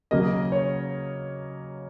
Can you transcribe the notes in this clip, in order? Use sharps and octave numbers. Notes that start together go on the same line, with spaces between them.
C#3 F#3 A#3 D#5
C#5